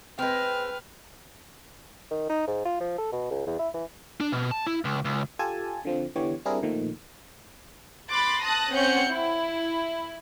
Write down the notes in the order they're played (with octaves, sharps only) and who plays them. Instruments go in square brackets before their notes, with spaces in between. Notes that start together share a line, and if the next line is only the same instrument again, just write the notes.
[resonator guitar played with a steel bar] G#3 C4 [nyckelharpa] B4 [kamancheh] G5 F6
[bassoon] D#3
D#4
G#2
F4
F3
A4
B2
C#2
E2
E4
E3
[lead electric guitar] D4
B2
A5
E4
C#2
C#2
[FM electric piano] F4 G4 A4 G#5 A5
D3 F3 C4
D3 E3 B3 G4 C#5
G3 C4 D4 E4 G#4 A#4
A#2 D#3 F3 A3
[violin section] B5 C6 D6 F#6 A6
A5 D#6 F#6 A#6
C4 C#4 C#5 F#5 G6 C#7
E4